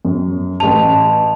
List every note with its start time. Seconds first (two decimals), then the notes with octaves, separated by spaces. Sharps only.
0.05 F#2
0.60 A1 A5 F7